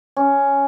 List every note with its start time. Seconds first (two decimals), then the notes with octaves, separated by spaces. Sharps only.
0.17 C#4